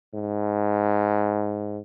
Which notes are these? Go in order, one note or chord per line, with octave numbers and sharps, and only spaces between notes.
G#2